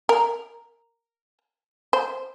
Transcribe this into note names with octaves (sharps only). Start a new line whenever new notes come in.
A#4
C5